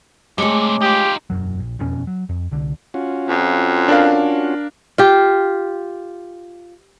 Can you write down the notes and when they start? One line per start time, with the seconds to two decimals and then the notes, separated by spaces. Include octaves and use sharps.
0.38 G2 C3 G#3 A3 G#4 C#5 D6
0.81 D#4 F4 G4
1.30 E1 C#2 F#2 F#3
1.59 A#1
1.79 E1 F2 B2 C#4
2.07 F#3
2.29 F2
2.51 C2 D3
2.94 C#4 F4 F#4
3.28 F2
3.89 D4 A#4 F5
4.98 F4 G4